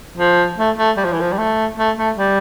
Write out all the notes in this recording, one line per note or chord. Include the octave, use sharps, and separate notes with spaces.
F3
A3
A3
G3
F3
E3
F3
G3
A3
A3
A3
G3